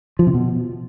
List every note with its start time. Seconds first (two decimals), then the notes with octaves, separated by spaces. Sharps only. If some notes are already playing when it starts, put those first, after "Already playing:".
0.19 F3
0.27 C3
0.34 B2